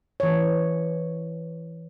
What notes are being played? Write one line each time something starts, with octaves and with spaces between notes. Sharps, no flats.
E3 C#5